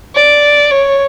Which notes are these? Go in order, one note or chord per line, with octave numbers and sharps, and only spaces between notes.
D5
C#5